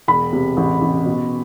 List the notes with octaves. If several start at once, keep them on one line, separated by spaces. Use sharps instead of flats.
E1 B5
C3
A1
A1
B2